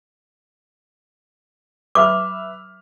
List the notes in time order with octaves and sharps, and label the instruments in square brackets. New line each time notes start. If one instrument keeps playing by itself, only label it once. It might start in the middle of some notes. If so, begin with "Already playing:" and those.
[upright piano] B4 E5 F6 [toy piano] D6